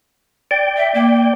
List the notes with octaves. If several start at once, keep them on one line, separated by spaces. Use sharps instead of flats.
D5 G5
E5
A#3